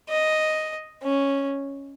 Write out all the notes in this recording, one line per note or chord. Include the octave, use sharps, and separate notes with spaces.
D#5
C#4